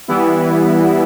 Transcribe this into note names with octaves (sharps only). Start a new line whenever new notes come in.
E3 G3 B3 E4